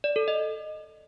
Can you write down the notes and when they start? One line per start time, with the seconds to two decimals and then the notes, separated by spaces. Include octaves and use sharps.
0.04 D5
0.16 A4
0.28 D#5